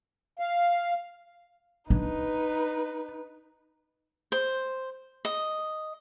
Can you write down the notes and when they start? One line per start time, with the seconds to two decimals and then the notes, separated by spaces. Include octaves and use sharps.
0.39 F5
1.90 D4 D#4 B4
4.32 C5
5.25 D#5